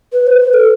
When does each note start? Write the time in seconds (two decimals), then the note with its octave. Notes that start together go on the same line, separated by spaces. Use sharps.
0.13 B4
0.27 C5
0.33 B4
0.54 A4